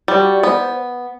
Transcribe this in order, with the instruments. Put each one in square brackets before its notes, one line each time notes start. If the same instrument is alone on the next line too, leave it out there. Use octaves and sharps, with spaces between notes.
[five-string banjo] G3 [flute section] F#4
[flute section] D5
[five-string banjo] B3 [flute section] C5